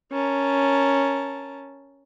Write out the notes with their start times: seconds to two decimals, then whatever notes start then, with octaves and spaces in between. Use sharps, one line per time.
0.13 C#4 A#4 A5